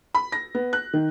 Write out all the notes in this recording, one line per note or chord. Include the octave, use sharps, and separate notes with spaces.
B5
A#6
B3
F#6
D#3